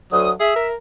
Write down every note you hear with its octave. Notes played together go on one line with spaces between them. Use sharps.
D2 F#3 D#6
G#4 E5
A#4